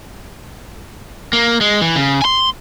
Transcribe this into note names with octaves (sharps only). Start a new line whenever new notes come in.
A#3
G#3
E3
C#3
G#5 C6